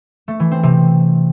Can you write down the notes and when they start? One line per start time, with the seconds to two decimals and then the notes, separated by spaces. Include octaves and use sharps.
0.28 A3
0.40 E3
0.51 C4
0.63 C3